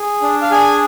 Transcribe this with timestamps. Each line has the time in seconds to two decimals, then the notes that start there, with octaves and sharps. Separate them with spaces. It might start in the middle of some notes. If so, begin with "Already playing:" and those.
Already playing: G#4
0.22 D4
0.42 F5
0.51 G#4 G#5